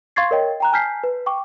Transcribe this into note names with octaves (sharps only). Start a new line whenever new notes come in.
F5 C6 C#6 G#6 A6 C7
A#4 C#5 D#5 G5
G5 A#5 F#6
G#5 A5 F6 G6 B6 C7
B4
G5 C#6 D6